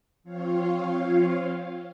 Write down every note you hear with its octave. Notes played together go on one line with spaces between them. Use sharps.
F3 C4 F4 C#5 F5